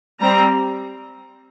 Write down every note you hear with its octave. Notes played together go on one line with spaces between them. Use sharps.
G3 C4 A#5